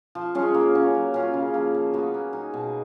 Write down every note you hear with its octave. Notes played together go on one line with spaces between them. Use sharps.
F3
G#3 C#4 F4
A#3
C#4 F#4 A#4
F#3
C#4 F4
C#3
F3 A#3
F3
B3 F#4 B4
A#3
D#4 G#4
B2